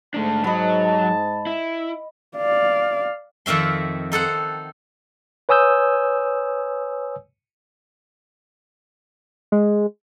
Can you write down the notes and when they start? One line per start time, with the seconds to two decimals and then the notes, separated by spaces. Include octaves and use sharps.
0.14 G#2 A3 D4 A5
0.44 F#3 D#5 B5
1.47 E4
2.38 D5 F5
3.46 F2 D#3 C4 E5 C6
4.12 D#4 A4 C5 F#5
5.49 B4 C#5 G#5 D#6 E6 G6
9.52 G#3